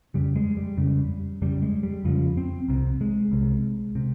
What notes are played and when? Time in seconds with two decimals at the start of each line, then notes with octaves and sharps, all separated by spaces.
0.14 F2 C#3 G3
0.36 G#3
0.57 G3
0.77 F2 C#3
1.42 F2 C#3 G3
1.62 G#3
1.83 G3
2.04 F2 C#3 F3
2.37 C4
2.68 C2 C3
3.01 G#3
3.32 C2 C3
3.95 C3